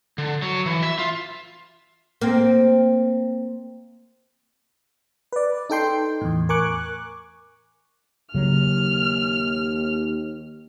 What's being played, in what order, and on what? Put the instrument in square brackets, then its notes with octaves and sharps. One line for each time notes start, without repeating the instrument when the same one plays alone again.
[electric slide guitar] D3
F#3
E3
E5
F4
[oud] A#3 C4
[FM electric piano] B4 D5
D#4 A4 G5 C6
E2 A2
A#4 G#5 C#6 D6 F#6
[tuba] D#2 [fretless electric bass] C#3 F#3 [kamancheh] F6